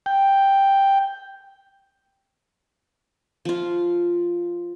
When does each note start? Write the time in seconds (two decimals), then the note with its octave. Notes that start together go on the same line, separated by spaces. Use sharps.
0.06 G5
3.45 F3 F4